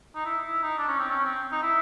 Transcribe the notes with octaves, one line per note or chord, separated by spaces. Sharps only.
D#4
E4
E4
D#4
D4
C#4
C4
C#4
C4
D#4
E4